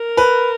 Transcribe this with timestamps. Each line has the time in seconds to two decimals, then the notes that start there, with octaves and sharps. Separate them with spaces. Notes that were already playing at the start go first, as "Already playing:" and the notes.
Already playing: A#4
0.17 B4